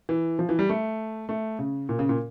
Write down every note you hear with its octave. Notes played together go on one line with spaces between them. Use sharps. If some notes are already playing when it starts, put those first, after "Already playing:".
E3
F3
E3
G3
A3
A3
C#3
A#2
C#3
A#2